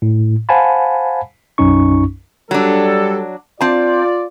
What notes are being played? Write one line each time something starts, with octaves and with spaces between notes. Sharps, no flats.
A2
C5 F5 F#5 G#5 A5 B5
B1 F#2 C#4 D#4 C#6
F#3 G3 D4 A4
C4 F4 D5 A5